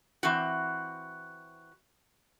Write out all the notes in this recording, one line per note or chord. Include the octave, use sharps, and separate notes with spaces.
E3 C4 F#4